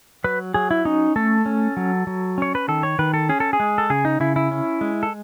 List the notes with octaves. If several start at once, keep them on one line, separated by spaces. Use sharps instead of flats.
F#3 B4
F#3 G#4
E4
C#4 D#4
A3 A4
C#4
F#3
F#3
C#4 C#5
B4
D#3 A4
C#5
D#3 B4
A4
C#4 G#4
A4
G#4
G#3
A4
C#3 G#4
D#4
C#3 E4
E4
C#4
G#3
A4